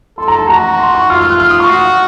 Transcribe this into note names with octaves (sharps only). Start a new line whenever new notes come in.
A4 C6
A#5
A5
F#4 A#5
C6
C#6
F4 F6
F6
F#6
F6
D#6
C#6
F#4